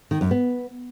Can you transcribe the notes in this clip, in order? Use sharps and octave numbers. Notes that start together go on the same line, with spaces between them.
D#3
F#2
B3